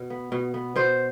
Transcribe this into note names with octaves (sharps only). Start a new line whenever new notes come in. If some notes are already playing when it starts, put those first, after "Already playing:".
Already playing: B2
B3
B2
B3
B2 C5